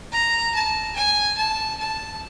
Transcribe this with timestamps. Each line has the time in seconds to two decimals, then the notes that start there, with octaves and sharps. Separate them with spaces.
0.12 A#5
0.55 A5
0.96 G#5
1.38 A5
1.79 A5